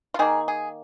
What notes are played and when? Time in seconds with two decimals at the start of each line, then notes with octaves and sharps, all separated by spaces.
0.14 F4
0.19 D#3 A#3 G#4
0.48 G#4